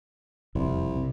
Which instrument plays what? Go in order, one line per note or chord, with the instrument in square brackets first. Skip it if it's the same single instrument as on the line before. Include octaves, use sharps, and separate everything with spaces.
[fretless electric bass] E1 F2 C3 [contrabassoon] C2
[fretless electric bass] B1 C3